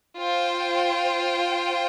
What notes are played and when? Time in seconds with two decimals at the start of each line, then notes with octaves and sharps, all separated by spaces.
0.19 F4 C5 G5